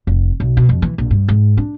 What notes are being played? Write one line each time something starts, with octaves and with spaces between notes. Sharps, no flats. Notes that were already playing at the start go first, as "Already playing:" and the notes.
F1
B1
B2
F2
E3
A#1
G2
G#2
D4